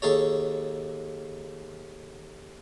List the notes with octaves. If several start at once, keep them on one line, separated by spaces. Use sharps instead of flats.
D#2 G#4 A4 C#5